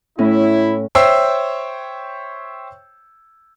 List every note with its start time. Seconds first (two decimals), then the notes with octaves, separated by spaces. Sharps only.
0.19 A2 C#4 E4
0.95 C5 C#5 E5 G5 E6 C7